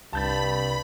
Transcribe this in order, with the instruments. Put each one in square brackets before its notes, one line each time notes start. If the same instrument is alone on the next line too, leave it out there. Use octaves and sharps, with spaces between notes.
[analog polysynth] C2 [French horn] G2 [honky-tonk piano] A5 G6 A6 [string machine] B5